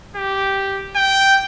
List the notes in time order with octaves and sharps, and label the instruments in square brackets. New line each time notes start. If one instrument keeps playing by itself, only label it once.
[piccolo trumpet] G4
G5